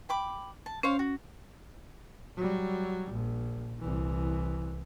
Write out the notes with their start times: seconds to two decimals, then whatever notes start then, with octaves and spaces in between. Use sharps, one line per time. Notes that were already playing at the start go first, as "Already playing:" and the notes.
0.09 G5 B5 D6
0.66 A5
0.83 C#4 C5 C#5 F5
0.99 F#4
2.37 F#3 G3
3.12 A#1
3.79 C2 E3